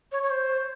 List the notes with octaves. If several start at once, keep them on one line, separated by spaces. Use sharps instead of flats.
C#5
C#5
C5